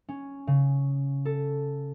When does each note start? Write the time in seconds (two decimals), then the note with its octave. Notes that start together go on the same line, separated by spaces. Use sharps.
0.09 C#4
0.47 C#3
1.25 A4